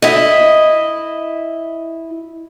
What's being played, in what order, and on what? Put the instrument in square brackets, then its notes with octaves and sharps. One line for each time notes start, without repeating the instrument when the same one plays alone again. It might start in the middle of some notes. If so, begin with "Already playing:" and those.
[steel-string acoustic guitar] E4 D#5